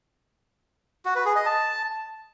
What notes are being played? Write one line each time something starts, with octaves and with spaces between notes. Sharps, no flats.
F#4
B4
G#4
D#5
A5